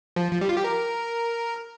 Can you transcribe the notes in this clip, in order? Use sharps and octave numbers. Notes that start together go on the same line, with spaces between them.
F3
F3
G3
F4
G4
A#4